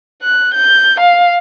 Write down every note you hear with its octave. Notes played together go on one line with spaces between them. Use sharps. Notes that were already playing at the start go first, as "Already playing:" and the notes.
F#6
G6
F5